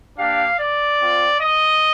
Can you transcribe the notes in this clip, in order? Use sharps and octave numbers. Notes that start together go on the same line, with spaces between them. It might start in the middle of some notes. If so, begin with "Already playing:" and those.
A#3 D4 G4 F5
D5
C4 F4
D#5